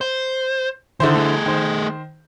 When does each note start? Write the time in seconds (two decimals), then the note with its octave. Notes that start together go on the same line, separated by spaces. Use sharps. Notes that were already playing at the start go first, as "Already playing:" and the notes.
0.01 C5
1.00 D3 D#3 E4 C5
1.15 A3 G#4
1.46 D#3 C5